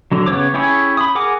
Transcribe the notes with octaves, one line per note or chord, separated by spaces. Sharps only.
D3 F#3
C#3 B3 C4 C#5 D6
C#4 E4 G4 G#4 C#5
B5 D#6
G#4 A#4 F#5 G#5 D6